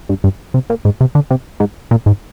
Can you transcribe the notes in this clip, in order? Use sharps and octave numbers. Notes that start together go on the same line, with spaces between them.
G2
G2
C3
A#2
G#2
C3
D3
C3
G#2
A#2
G#2